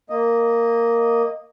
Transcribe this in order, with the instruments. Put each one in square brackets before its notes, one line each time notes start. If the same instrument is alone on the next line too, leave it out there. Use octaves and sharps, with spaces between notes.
[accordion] A#3 D#5